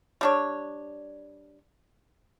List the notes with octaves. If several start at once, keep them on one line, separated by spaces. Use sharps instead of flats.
G3 D4 C#5